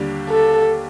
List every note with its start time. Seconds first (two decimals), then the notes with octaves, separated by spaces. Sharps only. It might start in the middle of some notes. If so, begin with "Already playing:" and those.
Already playing: D#2 D3 G3 D4 G4
0.29 A4